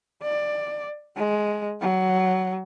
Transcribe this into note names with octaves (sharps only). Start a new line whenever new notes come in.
D5
G#3
F#3